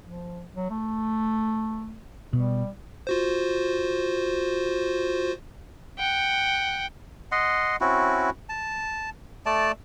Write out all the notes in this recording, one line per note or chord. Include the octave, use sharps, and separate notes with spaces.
F3
F#3
A3
B2 G3
F4 F#4 C5
F#5 G5
D#5 F#5 C6
C4 C#4 E4 F#4
A5
A3 D5 A5